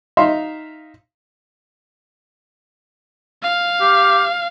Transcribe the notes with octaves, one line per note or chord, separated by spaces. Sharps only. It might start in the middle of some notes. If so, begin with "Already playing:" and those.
D#4 E5 F5 C6
F5
G4